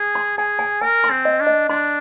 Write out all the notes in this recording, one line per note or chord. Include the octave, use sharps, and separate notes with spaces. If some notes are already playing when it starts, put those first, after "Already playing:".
Already playing: G#4
C6
G#4 G#5
G#5
A#4 G#5
C6
C4
D#5
D4
D#5
D4 C6